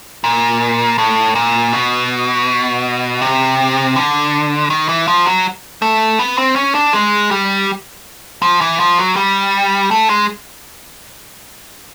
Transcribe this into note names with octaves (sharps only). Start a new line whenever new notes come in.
A#2
A2
A#2
B2
C3
D3
D#3
E3
F3
F#3
A3
B3
C4
C#4
D4
G#3
G3
F3
E3
F3
F#3
G3
A3
G#3